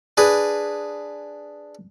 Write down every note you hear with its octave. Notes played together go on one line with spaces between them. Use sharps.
D4 G#4 B4